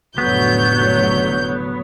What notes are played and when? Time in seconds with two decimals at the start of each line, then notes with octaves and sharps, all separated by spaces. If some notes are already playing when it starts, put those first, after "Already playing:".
0.18 F1 A2 D3 F#3 B3 C#5 G6